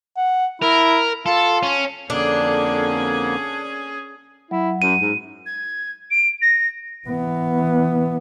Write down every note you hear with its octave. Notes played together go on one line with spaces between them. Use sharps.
F#5
E4 A#4
F4 A4
C#4
F2 D3 A#3 C#4 D4 G#4
F#3 E4
F#2 D#7
G#2
G#6
D7
A#6
E3 B3